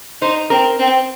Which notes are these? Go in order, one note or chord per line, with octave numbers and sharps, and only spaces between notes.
D#4 C5
C4 A#4
C4